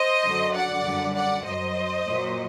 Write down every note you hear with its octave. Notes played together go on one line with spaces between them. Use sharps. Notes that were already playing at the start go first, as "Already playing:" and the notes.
Already playing: C5 D#5
F#2 D3 F#3
D5 F#5
F#2 D3 G3
D5 F#5
F#2 F#3 C5 D#5
A#2 F#3